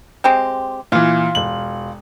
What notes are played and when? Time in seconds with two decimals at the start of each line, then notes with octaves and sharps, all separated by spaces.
0.24 G#3 C4 G4
0.92 A#2 E3 F4
1.35 E1 F#7